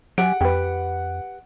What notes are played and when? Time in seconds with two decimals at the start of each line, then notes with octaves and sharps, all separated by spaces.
0.18 F#3 G4 F#5 G#5 D7
0.41 F2 G4 B4